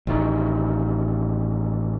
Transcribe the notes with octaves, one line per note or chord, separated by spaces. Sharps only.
A1 D#3